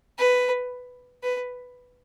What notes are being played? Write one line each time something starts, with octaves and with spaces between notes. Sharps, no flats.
B4
B4